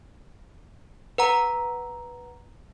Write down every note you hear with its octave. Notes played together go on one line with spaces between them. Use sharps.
B4 F#5 A#5